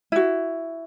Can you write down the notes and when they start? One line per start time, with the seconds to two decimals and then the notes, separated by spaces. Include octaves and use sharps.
0.12 E4 F#4